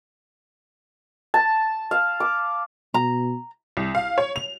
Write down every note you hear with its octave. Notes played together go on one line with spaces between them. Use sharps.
A5
F5
D6
B2 A#5
C2
F5
C#5
F7